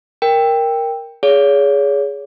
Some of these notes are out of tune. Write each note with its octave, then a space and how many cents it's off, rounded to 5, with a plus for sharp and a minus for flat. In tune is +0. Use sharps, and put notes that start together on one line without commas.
A#4 +0 G5 +10
G#4 +0 C#5 +35 F5 +0